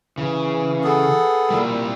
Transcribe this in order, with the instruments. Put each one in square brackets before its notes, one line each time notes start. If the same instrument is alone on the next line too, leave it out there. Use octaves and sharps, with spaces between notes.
[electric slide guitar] C#3 [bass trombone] E3
[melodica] B3 G#4 A4
[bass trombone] A#2 [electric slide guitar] G3 E4